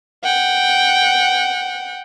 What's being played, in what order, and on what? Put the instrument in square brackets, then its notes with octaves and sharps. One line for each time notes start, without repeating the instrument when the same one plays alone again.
[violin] F#5 G5